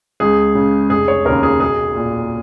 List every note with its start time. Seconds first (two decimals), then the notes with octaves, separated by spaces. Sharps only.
0.20 C#2 G#4
0.55 C#3
0.90 F1 G#4
1.08 C#5
1.25 D#2 C#3 A#4
1.43 G#4
1.60 B1 G#4
1.95 A#2